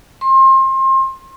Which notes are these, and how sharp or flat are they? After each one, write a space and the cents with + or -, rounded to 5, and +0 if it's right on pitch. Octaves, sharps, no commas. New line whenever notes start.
C6 +30